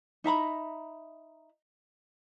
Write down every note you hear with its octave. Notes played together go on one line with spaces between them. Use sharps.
D#4 E5 A#5 B5